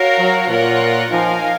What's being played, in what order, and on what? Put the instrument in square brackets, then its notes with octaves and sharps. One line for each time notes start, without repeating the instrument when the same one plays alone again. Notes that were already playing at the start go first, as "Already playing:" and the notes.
Already playing: [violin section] F#4 A#4 C#5 F5
[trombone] F#3
[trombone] A#2 [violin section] F4 A#4 C#5 F#5
[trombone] F3 [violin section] D#4 A#4 F5 G#5